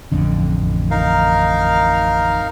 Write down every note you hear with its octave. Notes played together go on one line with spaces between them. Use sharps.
A1 F2 D3
D#4 A#4 F5